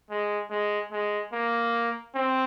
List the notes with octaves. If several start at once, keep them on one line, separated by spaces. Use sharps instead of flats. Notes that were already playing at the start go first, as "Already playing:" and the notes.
G#3
G#3
G#3
A#3
C4